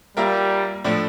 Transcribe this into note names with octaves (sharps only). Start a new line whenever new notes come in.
G3 A#3 F4 A#4 E5
A2 F3 A3 D4